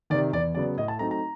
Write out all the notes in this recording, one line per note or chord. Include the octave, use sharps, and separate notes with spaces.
C3 D#3 D5
E2 D5
C#3 F#3 B3 D5
A2 D#5
A5
F#3 A3 C4 D#4 A#5
A#5